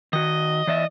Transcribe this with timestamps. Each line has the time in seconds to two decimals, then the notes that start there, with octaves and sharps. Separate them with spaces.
0.13 D#3 F#4 D#5
0.67 E3 D5 E5